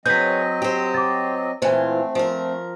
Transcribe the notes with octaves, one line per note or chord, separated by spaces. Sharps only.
F#3 C4 C#4 G#4 B4 D#5 G6 B6
G4 C5
D6 A6
A#2 E3 A3 C4 F4 C5 G#5
F3 A#4